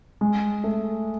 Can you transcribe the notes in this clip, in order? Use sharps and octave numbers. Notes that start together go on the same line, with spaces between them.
G#3
A3